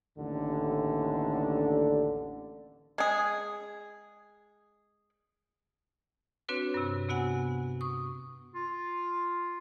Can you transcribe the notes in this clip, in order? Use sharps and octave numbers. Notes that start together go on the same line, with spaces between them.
A1 D#2 D3
G#3 G#4
C4 D4 F#4 B4 C#5
G2 C3
C3 B3 F#4 F#5 G#5
C#6 D#6
F4